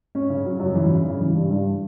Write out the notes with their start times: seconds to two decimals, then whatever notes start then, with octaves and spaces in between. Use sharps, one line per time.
0.15 C#4
0.30 C#3
0.45 F#3
0.59 F#2
0.75 E3
0.89 C#3
1.05 C#3
1.20 E3
1.35 G2
1.51 G2